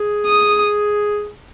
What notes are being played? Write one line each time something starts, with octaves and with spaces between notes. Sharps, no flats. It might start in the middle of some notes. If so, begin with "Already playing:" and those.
Already playing: G#4
D#6